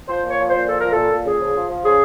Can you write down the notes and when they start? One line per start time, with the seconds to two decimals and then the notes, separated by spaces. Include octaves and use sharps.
0.09 F3 C5
0.23 A#2
0.29 C#5
0.38 F3
0.48 A#2 C5
0.67 F3 A4
0.80 A#2 A#4
0.92 A#2 A4
1.11 A#2
1.26 C#3 G#4
1.40 F3
1.55 F3
1.69 F3
1.84 C#3 G#4